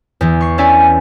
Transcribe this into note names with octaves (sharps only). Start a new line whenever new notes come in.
E2 E3
C#6 C7
C#4 E4 D5 E5 G#5